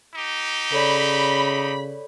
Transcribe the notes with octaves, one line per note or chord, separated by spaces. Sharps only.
D#4 G4
C#3 A4 C#5 D5 B5